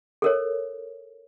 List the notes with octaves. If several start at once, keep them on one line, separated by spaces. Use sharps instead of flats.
A4 A#4 C#5